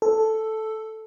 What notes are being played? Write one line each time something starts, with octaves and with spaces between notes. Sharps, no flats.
A4